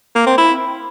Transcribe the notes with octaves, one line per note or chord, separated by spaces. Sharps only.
A#3
C4
E4